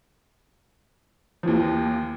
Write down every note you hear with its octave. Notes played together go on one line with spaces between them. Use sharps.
D#2 E3 F3